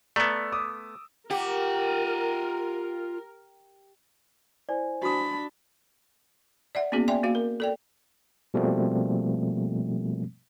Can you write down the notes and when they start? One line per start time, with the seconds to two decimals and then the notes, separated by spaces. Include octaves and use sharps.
0.16 A3 B3 D5 A#5 E6
0.52 D6 D#6
1.30 F4 G4 A#4 F#5
4.69 E4 C5 D5 G#5
5.03 D4 F#4 B5 D#6
6.75 D5 E5 F#5
6.92 A#3 B3 C#4 F#4 G#4
7.08 D5 E5 G5 G#5 C6
7.23 A#3 F#4 F5
7.35 A#4
7.60 A4 D5 G5
8.54 B2 F3 G3 A3 A#3 C4